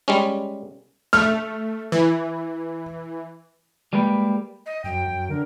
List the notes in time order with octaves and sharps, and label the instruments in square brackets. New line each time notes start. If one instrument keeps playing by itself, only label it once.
[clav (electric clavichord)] G3 G#3 C#4
[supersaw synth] A3 [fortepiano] F6
[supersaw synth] E3
[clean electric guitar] G3 G#3 A#3 B4 F5 G5
[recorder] D#5
[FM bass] F#2 [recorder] G5
[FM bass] F#2
[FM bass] D3 [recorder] A#4